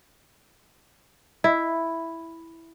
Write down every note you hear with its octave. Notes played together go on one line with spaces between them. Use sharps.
E4